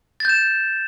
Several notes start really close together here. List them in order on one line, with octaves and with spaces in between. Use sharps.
A6 G6 E7